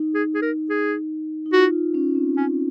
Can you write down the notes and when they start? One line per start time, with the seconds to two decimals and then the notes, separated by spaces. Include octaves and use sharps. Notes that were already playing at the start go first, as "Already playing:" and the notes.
Already playing: D#4
0.14 G#4
0.35 G#4
0.42 A#4
0.70 G#4
1.46 D#4
1.53 F4 F#4
1.94 C#4
2.15 C4
2.37 C#4